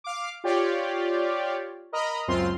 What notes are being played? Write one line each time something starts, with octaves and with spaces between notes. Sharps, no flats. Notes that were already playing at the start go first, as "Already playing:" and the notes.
F5 D6
F4 G4 C#5 D5
A#4 D#5 A#5 B5
C#2 F#2 C4 F4 C6